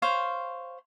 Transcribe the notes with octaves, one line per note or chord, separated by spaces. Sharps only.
C5 C#5 F5